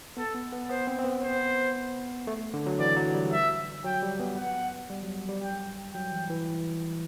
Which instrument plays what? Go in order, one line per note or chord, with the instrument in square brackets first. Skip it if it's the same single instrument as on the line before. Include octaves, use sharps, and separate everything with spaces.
[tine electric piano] B3 [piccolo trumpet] A4
[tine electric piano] B3
B3
[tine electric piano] B3 [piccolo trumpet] C5
[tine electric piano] C4
C4
B3
[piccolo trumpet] C5
[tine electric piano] A3
D3
F#3
[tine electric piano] E3 [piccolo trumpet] D5
[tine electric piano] F#3
G3
[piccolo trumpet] E5
[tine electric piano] F#3 [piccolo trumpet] G5
[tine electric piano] G3
B3
[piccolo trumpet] F#5
[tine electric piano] G3
F#3
G3
[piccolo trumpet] G5
[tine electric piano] F#3 [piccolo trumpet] G5
[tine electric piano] E3
E3